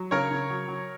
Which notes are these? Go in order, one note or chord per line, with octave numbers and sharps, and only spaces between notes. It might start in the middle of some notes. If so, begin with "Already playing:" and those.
Already playing: F#3
C#3 A#4 C#5
C#3
F#3
F#3